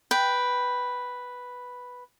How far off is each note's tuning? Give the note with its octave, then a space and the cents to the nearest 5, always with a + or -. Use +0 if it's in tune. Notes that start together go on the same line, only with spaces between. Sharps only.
B4 +0 G5 +0